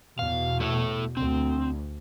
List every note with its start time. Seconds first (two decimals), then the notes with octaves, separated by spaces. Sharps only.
0.19 E2 B2 F5
0.60 A3 E4 A4
1.17 D2 C4